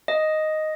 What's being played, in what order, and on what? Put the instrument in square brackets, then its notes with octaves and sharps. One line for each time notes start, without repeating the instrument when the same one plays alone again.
[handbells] D#5